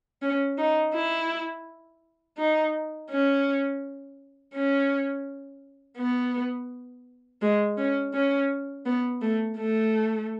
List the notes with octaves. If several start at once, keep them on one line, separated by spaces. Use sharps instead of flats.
C#4
D#4
E4
D#4
C#4
C#4
B3
G#3
C#4
C#4
B3
A3
A3